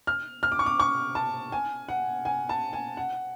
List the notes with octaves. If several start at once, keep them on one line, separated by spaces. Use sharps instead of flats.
F6
F6
D6
C#6
D6
C#6
A5
G#5
F#5
G#5
A5
G#5
F#5